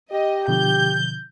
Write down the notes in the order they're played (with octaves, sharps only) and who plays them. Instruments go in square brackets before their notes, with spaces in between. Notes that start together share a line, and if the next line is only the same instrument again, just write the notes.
[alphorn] G4 [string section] D#5
[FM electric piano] B2 D3 F3 [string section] G6